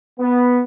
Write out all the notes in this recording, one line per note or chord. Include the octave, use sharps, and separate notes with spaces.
B3